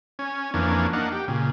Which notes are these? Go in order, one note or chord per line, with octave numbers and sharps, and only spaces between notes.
C#4
F2 E3 A#3 C#4 D4
A#3 D4 D#4 F#5
G4
A#2 C#3